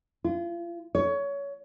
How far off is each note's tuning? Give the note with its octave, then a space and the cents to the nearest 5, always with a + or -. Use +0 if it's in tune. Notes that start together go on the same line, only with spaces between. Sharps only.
F4 -35
C#5 +20